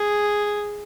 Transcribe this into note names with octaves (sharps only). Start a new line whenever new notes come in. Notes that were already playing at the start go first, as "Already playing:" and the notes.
Already playing: G#4